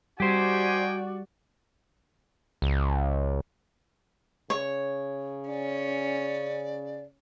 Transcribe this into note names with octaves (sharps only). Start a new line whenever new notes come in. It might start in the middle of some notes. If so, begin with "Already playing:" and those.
G3 D#4 F#4 G4 C5 D5 G5 G#5
C#2
C#3 C#5
C#4 D5